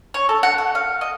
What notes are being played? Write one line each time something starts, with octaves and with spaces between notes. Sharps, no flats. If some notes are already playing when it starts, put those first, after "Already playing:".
C#5
A4
F#5
F#5
F5
D#5